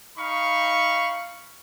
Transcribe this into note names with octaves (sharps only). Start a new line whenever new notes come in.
D#4 F5 B5 C#6